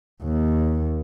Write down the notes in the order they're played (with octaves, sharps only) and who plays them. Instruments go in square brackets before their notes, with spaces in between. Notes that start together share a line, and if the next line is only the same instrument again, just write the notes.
[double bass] D#2